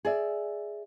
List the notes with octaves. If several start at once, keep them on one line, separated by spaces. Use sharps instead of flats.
G#4 D5 E5